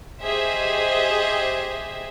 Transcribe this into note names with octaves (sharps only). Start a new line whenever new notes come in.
G4 G#4 C5 D#5 E5